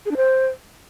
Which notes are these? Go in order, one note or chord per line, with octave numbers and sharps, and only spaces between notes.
G#4
D4
C5